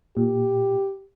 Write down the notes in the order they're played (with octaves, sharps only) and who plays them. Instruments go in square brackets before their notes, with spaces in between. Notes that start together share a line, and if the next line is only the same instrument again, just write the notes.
[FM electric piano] A#2 [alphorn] G4